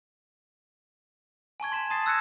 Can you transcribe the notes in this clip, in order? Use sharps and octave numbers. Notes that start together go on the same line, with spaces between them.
G#5 A5 C#6 G#6
C6 B6 E7
A5 D#6 A6 C7
E6 F#6 G#6 A#6 C#7 E7